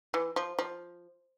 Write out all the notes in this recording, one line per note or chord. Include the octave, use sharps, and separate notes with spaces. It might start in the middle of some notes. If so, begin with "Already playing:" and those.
E3
F3
F3